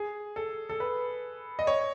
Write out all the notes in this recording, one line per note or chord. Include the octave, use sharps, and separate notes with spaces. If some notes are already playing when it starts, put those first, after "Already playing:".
Already playing: G#4
A4
A4
B4
D#5
C#5